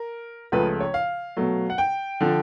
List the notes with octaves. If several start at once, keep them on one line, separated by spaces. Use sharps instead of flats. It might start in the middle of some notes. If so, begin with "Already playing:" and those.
Already playing: A#4
C#2 C#3 F3 A3 B4
C#5
F5
B2 F#3 A3
F#5
G5
D3 F3